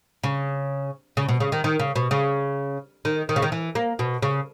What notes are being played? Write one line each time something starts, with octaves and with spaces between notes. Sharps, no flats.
C#3
C#3
B2
C#3
D#3
D#3
C#3
B2
C#3
D#3
D#3
C#3
D#3
E3
A#3
B2
C#3